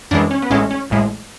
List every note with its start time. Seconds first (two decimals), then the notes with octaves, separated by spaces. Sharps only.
0.11 F#2 E3 G#3 D4
0.31 C#4
0.42 B3
0.50 A1 A2 G#3 C#4
0.71 C#4
0.90 A1 A2 G#3